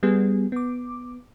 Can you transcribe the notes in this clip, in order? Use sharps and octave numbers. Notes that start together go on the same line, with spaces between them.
G3 B3 G#4
B3 D6